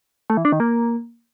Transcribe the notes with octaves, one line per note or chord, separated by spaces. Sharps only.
A3
E3
D4
D#3
A#3